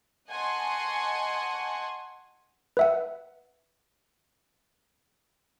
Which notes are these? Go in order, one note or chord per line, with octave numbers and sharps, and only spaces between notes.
D#5 F#5 G#5 A5 C6 C#6
B4 E5 F#5